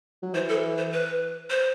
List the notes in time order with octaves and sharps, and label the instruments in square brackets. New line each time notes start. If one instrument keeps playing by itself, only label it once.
[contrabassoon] F#3
[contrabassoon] E3 [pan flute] C5
[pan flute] A4
C5
B4
C5